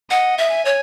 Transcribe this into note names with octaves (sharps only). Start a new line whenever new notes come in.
D#5 F#5
E5
G#5
C#5